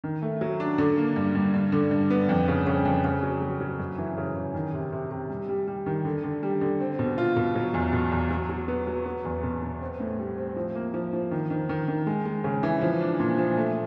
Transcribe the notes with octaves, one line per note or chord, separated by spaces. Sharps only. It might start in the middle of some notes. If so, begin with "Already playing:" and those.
D#3
A3
F#3
D4
D3
A#3
G2
G2
G2
D3
G2
B3
F2
C#3
C#3
F2
C#3
F#3
F#3
F#3
F#2
E3
C#3
C#3
D#3
C3
C3
C3
G3
G3
G3
D#3
D3
D3
G3
D3
C4
B2
F4
B2
F#3
E2
B2
E2
F#3
F#3
B3
F#3
B3
E2
B2
B3
C4
A2
G3
C4
F3
A#3
F3
F3
D#3
D#3
D#3
D#3
G#3
G#3
C#3
E3
F3
D4
A#2
F3
A3